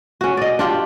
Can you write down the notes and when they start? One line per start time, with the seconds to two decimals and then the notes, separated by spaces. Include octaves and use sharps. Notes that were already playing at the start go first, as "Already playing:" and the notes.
0.21 C#4 F#4
0.37 D5 D#5
0.59 D4 F4 G4